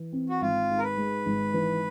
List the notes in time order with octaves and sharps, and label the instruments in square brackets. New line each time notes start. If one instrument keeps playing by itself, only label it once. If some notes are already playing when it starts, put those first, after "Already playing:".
Already playing: [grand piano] E3
C4
[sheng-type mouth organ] F#4
[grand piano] G#1 [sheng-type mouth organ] F4
[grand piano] G#2
[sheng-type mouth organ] A#4
B4
[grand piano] G#3
G#1
E3